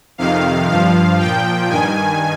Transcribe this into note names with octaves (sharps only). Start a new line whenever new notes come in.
F2 C3 D#3 F5
G2 F3 F5
A#2 F3 G5
G2 D#3 G#5